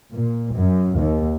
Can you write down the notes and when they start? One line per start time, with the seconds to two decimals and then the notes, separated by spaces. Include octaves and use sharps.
0.13 A#2
0.55 F#2
1.00 D#2